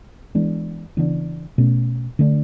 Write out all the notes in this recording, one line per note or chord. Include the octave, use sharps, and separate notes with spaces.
E3 G#3 B3 D4
C#3 E3 B3 D4
B2 A3 C#4
D3 A3 D4